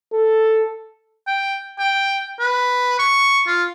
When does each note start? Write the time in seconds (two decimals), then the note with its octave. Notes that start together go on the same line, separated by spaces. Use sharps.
0.13 A4
1.27 G5
1.79 G5
2.39 B4
2.99 C#6
3.47 F4